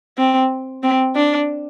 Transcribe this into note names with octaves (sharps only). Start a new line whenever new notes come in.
C4
C4
D4